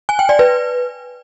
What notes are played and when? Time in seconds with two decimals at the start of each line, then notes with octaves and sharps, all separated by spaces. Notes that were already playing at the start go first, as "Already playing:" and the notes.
0.09 G#5
0.19 G5
0.29 D5
0.39 B4